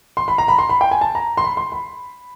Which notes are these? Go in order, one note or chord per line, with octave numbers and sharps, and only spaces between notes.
C6
B5
A#5
B5
C6
B5
G5
G#5
A5
A#5
C6
B5
C6
B5